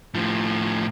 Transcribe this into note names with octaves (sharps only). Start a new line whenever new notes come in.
A2 F3